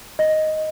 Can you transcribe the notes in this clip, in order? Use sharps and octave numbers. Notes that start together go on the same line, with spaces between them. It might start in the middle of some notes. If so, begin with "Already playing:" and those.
D#5